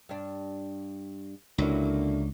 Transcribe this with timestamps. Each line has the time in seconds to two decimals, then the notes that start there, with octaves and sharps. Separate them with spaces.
0.09 G2 D4
1.58 C#2 D3 F#3 A#3 E4